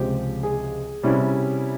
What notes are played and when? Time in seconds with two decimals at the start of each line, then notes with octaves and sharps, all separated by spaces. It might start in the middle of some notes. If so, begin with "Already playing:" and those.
Already playing: C#2 C3 F3 G#3 G4
0.43 G#4
1.03 C3 G3 C#4 E4